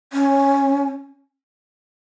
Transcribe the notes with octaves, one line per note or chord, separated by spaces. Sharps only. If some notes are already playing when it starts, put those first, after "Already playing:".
C#4